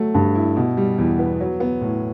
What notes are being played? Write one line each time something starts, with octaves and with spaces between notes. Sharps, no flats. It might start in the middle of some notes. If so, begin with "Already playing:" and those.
Already playing: F#3 A3
G2
E4
B2
G3
E2
B3
F#3
B3
A2